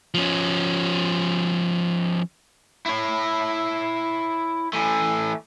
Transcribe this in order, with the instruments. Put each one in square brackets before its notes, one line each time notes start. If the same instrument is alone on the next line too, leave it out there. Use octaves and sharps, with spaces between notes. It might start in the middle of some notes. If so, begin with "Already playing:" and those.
[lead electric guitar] F3 C#4
[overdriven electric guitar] E4 C#5
E3 A3